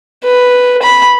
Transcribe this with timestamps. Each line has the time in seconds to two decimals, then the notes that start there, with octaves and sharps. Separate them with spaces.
0.25 B4
0.83 B5